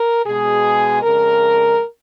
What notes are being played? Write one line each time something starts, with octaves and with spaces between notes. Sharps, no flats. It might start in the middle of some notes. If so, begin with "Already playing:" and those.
Already playing: A#4
B2 G#3 G#4
F2 C#3 G#3 A#4